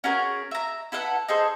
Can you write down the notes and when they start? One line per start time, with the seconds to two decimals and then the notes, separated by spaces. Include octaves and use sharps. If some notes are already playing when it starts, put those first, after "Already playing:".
0.04 C#4 F#4 G#4 A#4
0.51 E5 A#5
0.92 E4 A4 B4 F#5
1.28 D#4 G#4 A4 C5